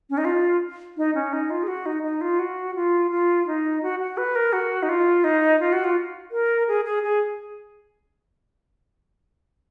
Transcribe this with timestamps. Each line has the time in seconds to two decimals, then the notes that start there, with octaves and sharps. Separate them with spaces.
0.10 C#4
0.18 D#4
0.25 F4
0.97 D#4
1.15 C#4
1.33 D#4
1.50 F4
1.63 G#4
1.68 F#4
1.86 D#4
2.03 D#4
2.21 F4
2.39 F#4
2.75 F4
3.11 F4
3.47 D#4
3.83 F#4
3.99 F#4
4.18 B4
4.36 A#4
4.53 F#4
4.83 D#4
4.89 F4
5.24 D#4
5.60 F4
5.73 F#4
5.84 F4
6.31 A#4
6.68 G#4
6.85 G#4
7.03 G#4